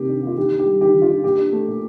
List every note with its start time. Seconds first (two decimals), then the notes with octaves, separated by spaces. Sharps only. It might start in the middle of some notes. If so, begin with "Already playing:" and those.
Already playing: C3 D#3 A#3 G4
0.09 D4
0.22 A#3 F4
0.37 D#3 G4
0.52 D4
0.59 G4
0.66 G3
0.80 D#3 G4
0.95 D#3
1.02 F4
1.10 D4
1.24 A#2 G4
1.38 D4
1.52 A3
1.68 A#2